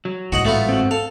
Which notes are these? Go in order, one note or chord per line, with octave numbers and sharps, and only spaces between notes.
F#3
A1 G#2 F#4 D#5 F#5
A3 B3 F4
C4 F#4
A4 F5